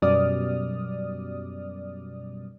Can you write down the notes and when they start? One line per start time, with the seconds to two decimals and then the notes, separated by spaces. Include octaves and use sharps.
0.02 F#2 B2 G3 D5 D#6 F6